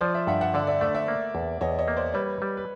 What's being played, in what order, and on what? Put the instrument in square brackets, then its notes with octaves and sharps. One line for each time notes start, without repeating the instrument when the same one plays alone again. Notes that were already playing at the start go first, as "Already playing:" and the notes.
[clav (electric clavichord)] F3 [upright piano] C5 D5
[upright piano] D5 E5
[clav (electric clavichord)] G2 [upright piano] E5 F#5
[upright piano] E5 F#5
[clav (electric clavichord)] D3 [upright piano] D5 E5
[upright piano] D5 E5
[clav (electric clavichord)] A3 [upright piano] D5 E5
[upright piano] D5 E5
[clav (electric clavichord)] A#3
E2
[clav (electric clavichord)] E2 [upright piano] C#5 D#5
[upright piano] C#5 D#5
[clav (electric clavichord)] A#3
[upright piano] C5 D5
[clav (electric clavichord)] G3 [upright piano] B4 C#5
[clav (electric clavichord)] G3
[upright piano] B4